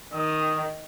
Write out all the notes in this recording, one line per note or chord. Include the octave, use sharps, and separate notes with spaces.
D#3 D#6